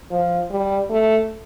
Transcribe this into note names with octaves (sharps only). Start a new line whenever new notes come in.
F3
G3
A3